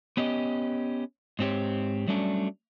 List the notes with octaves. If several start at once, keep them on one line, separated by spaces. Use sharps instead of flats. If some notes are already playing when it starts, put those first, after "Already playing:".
B3 C#4 G4 D#5
G#2 C4 G4 C#5
F#3 G3 A3 C#4 D4